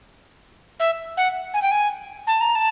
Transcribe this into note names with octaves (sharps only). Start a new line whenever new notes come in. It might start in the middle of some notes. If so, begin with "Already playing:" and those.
E5
F#5
G#5
G5
G#5
A5
A#5
A5